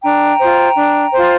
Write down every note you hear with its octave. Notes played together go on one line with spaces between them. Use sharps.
D4 G5 A#5
F4 C5
D4
F4 C5